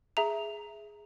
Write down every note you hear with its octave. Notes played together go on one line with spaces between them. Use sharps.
G#4 E5 A#5 F7